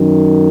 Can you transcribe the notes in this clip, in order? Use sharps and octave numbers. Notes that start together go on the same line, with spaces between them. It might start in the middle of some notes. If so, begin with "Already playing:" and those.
Already playing: F#2 D#3